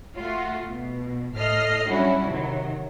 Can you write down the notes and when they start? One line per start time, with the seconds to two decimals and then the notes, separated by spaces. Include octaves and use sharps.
0.17 A3 F4 F#4
0.69 B2
1.35 A2 A4 D#5 F6 C7
1.87 F#3 G3 C#4 D4 E4 F#4
2.27 C3 D#3 F#3